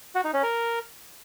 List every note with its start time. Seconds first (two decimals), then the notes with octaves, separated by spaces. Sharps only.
0.15 F#4
0.24 D#4
0.34 C#4
0.43 A#4